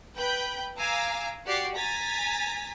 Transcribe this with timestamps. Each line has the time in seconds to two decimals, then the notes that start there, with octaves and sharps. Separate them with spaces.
0.16 B4 G5 B5 G6
0.79 F5 G#5 A#5 D6 E6
1.46 F#4 G4 D5 F#5 C7
1.77 G#5 A#5 A6 B6